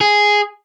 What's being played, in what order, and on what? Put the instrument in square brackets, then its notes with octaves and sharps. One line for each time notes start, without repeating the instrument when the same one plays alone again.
[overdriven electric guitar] G#4